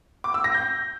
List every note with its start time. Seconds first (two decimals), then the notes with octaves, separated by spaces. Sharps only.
0.24 D6
0.34 E6
0.44 A#6
0.54 G6